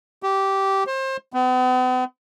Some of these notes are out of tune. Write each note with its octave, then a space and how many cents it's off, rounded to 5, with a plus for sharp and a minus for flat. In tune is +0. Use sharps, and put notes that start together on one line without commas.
G4 -15
C5 +30
B3 +45